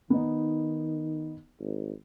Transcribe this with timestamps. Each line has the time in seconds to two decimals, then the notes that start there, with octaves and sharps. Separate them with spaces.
0.10 D#3 B3 D#4
1.60 G#1